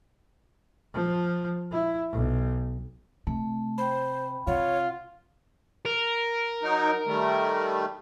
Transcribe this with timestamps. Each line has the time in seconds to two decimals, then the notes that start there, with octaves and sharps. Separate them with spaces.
0.94 F3
1.72 E4
2.12 B1
3.27 C3 A3
3.78 C5 G5 B5
4.47 C3 F4 C#5 F#5
5.85 A#4
6.63 F#3 D#4
7.07 D#3 G3 A3